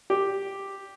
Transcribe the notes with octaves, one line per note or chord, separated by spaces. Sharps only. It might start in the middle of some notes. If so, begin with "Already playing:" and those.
G4